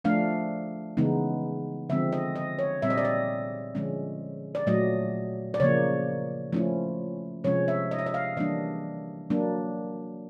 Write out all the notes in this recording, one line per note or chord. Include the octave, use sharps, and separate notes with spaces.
F3 A3 D4 F5
C#3 E3 G#3 B3 D#4
D3 F3 G#3 C4 E5
D#5
D#5
C#5
A#2 G3 C4 E5
D#5
D5
D#5
D3 F3 G#3 C#4
D5
A#2 F#3 A3 D#5
D5
C#3 F3 A#3 C#5
F3 A3 C#4 E4
C3 F3 G#3 C#4 C#5
E5
D#5
E5
D#5
F5
E3 G3 A#3 D4 D#5
F#3 A#3 D4